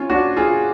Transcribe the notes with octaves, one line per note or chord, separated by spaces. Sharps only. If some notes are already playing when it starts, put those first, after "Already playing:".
Already playing: C#4 F4
D4 F#4
F4 G#4